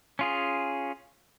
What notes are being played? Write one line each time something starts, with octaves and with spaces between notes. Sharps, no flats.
C#4 F4 G#4